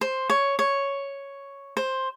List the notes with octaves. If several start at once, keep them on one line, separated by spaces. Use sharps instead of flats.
C5
C#5
C#5
C5